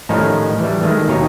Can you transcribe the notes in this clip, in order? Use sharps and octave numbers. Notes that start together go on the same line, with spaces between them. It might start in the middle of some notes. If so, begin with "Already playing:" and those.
A2 D#3 F3 G3 C#4 D#4
E3 G3
D#3 G#3 A3
D#2 B2 D#4 G4 C#5